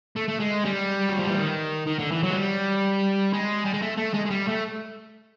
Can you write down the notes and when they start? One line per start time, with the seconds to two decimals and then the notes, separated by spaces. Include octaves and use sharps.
0.17 A3
0.29 A3
0.40 G#3
0.65 G3
1.09 F#3
1.19 F3
1.29 E3
1.39 D#3
1.87 D#3
1.99 D3
2.12 E3
2.23 F#3
2.31 G#3
2.35 G3
3.33 G#3
3.65 G3
3.74 G#3
3.82 A3
3.98 A3
4.14 G#3
4.26 G#3
4.30 G3
4.48 A3